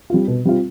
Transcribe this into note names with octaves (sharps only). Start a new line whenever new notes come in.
G3 C4 F4
B2
G3 C4 F4